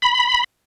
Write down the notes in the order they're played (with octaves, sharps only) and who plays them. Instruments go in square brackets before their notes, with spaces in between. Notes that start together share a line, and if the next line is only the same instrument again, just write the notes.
[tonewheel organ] B5